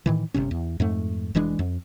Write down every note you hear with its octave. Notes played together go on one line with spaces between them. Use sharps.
A2 D#3 E3
G1 C#2 C3 C#4
E2
F2 G#2 A3
F1 E3 G#3 D4
F2